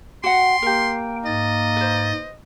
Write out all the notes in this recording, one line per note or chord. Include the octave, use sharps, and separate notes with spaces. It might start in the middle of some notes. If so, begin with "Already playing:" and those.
F#4 F#5 G5 C6
A#3 G4 A#4
G#2 D#5 A6
B4 C5